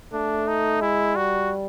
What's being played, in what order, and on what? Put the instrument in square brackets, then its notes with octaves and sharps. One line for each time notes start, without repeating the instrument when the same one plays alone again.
[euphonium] A3 [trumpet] D4
[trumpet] D#4
[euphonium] G#3 [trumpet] E4
[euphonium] G3 [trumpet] F#4